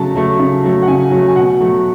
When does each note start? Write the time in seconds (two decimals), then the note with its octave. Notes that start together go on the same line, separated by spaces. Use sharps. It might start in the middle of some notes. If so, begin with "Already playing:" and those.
Already playing: C#3 F#3 A3 A5
0.15 F#3 A3
0.39 C#3
0.64 F#3 A3
0.82 F#5
0.88 C#3 G#5
1.11 F#3 A3
1.28 G#5
1.36 B2 F#5
1.60 F#3 A3